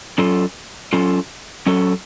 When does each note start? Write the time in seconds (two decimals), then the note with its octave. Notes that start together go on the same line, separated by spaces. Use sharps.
0.18 F#3 C#4 F4 A4
0.93 F#3 C#4 F4 A4
1.66 F#3 C#4 F#4 A4